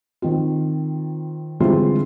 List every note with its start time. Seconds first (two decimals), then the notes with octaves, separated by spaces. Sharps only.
0.22 D#3 C4 F4
1.60 D3 E3 G3 G#3 C4 F4